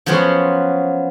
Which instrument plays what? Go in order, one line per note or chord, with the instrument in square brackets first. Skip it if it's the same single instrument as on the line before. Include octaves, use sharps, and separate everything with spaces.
[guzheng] F3 F#3 B3 C#4 C5